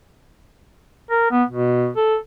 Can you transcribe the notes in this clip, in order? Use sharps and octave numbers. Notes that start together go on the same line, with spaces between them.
A#4
B3
B2
A4